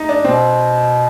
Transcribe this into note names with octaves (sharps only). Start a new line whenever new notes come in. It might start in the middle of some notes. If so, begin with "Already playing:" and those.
Already playing: D#4
D4
B2 C4